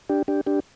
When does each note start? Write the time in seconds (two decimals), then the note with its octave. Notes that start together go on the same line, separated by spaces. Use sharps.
0.09 D4 G4
0.28 D4 G4
0.46 D4 G4